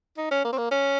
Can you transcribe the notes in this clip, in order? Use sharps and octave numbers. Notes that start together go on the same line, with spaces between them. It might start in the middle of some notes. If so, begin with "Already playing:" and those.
D#4
C#4
A#3
C4
A#3
C#4